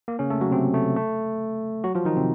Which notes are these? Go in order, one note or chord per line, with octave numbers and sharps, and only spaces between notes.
A#3
C#3 C#4
A3 A4
F#3 F#4
C3 C4
A3
A3
F#3 F#4
F3 F4
D#3 D#4
C3 C4